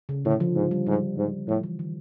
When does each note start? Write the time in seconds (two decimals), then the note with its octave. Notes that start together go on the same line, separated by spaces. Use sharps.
0.09 C#3
0.25 A2 D3
0.40 F3
0.55 G#2
0.71 G3
0.87 G#2 G3
1.17 G#2
1.47 A2 F3
1.63 E3
1.79 D#3